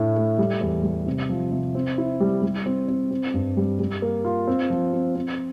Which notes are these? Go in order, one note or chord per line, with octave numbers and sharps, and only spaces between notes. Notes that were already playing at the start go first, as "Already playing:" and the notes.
Already playing: A2 A3 D4
A3
G3
E2
G3
C3
F3
C3
C4
E4
G3
G3
C4
C4
C4
G2
G3
G3
A#3
F4
C4
F3
C4
C4